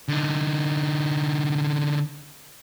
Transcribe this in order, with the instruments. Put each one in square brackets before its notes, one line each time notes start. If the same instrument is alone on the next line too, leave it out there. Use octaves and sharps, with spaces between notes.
[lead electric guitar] D3 D#4